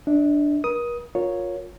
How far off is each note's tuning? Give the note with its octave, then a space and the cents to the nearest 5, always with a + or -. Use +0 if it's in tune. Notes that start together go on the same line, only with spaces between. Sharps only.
D4 +0 E5 -45
A#4 +45 D#6 +10
F4 +25 A#4 +0 C#5 +0